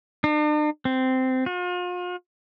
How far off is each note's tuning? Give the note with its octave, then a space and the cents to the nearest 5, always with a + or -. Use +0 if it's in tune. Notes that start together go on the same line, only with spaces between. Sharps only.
D4 +45
C4 -15
F4 +40